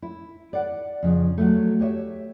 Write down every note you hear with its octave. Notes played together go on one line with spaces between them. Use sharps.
E4
D5 F#5
F2 C#3
F#3 A3
G4 C#5 D#5 E5